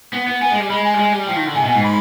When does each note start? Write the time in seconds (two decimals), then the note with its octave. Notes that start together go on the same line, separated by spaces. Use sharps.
0.13 B3
0.27 B3
0.41 B3 G#5
0.51 G#3
0.60 G3
0.70 G#3 B5
0.85 G#5
0.94 G3
0.98 G#3
1.12 G3
1.27 F3 G5
1.36 D#3
1.46 D3
1.55 C3 G#5
1.65 B2
1.70 G#2 G#5
1.84 B5